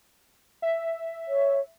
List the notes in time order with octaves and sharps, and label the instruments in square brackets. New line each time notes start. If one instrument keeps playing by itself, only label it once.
[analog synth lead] E5
[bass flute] C#5